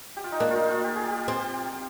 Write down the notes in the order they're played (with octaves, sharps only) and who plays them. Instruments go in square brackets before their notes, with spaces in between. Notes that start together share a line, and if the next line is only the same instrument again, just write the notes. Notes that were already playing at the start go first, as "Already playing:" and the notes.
[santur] G4
F4
D#4
[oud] A#3 [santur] D4
[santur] D#4 F4
D#4
F4
G4
G#4
G4
F4
[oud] C4 [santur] G4
[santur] G4